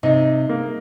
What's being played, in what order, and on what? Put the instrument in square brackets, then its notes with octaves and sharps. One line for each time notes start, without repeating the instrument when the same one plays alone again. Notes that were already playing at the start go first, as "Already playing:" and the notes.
[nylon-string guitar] C3 [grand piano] D#4
[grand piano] A#3